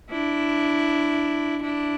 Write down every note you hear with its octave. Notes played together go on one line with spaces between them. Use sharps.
D4 E4
D4 E4